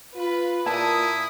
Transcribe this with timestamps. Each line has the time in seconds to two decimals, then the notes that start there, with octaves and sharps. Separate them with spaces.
0.16 F4 B4 B5
0.66 A#2 E4 A5 D#6